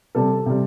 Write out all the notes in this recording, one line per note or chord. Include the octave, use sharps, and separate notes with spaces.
C3 G3 A4
C3 G3